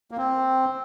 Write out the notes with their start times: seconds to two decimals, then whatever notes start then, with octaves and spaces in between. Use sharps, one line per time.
0.11 A#3
0.17 C4